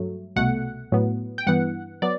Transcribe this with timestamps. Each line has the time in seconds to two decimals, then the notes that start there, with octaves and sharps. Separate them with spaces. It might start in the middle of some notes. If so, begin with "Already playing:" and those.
Already playing: G2 F#3 A3
0.36 C2 B2 A3 F#5
0.92 A2 F#3 B3
1.38 G5
1.47 G2 E3 B3 F#5
2.02 F#3 B3 D5